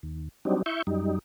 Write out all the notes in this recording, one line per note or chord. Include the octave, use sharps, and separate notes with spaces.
D#2
F#3 G3 C4 D4 D#4
E4 E5 C#6 G6
F#2 G3 D#4